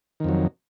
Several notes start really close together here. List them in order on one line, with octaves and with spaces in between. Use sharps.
D#3 F2 F#3